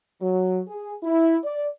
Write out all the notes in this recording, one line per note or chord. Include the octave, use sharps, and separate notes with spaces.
F#3
G#4
E4
D5